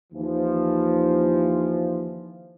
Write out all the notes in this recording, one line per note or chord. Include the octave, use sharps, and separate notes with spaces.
D#2 E3 F3